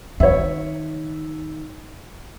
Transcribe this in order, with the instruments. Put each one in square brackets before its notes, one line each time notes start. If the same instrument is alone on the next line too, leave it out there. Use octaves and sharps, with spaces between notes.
[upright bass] D#3 [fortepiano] C#5 E5